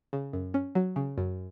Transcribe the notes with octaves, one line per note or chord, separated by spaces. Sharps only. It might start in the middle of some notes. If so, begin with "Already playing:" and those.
C#3
F#2
C#4
F#3
C#3
F#2